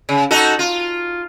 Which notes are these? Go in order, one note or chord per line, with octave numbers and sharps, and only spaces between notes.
C#3
D#4 F#4 A4
F4